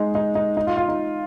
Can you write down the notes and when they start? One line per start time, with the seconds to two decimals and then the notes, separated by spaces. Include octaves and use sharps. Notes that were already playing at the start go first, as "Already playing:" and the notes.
Already playing: G#3 D#4
0.15 D#4
0.35 D#4
0.57 D#4
0.67 F4
0.77 F4
0.88 D#4